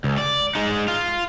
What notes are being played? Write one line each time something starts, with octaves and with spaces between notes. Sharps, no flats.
C#2
D5
G#3 D#4
F4